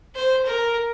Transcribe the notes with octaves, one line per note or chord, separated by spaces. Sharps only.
C5
A#4